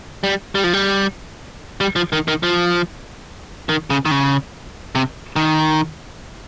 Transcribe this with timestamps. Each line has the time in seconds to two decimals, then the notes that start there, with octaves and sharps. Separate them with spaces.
0.24 G3
0.55 G3
0.64 F3
0.73 G3
1.80 G3
1.96 F3
2.12 D#3
2.28 D#3
2.43 F3
3.69 D#3
3.90 C#3
4.05 D#3
4.11 C#3
4.95 C3
5.36 D#3